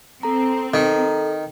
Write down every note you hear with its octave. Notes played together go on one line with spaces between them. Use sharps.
C4 A4 A#5
D#3 A4 A#5